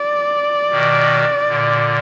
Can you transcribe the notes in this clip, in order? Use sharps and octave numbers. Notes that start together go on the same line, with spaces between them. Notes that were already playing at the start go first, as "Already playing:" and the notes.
Already playing: D5
B2 D#3
A#2 D3